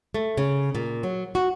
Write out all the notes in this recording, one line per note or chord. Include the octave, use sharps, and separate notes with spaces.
A3
C#3
A#2
F#3
F#4